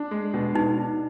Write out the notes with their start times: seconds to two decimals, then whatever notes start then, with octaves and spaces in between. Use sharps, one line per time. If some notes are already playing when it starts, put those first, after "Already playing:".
Already playing: D4
0.11 G#3
0.34 B2
0.54 B2 D#4
0.76 D4